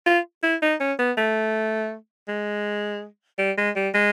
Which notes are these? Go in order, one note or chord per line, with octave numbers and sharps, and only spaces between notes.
F4
E4
D#4
C#4
B3
A3
G#3
G3
G#3
G3
G#3